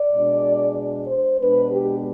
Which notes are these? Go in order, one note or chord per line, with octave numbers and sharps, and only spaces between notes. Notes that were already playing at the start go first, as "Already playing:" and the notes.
Already playing: D5
B2 G#3 D4
C5
B2 G#3 B3 D4 B4
G4